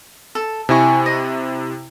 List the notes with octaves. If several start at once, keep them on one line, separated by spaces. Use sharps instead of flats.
A4
C3 E4 D#5 G#5 C#6
D#5